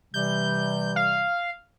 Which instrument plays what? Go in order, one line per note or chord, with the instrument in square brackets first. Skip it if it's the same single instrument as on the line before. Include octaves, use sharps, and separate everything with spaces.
[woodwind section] C3 E3 G3 [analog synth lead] G6
[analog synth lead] F5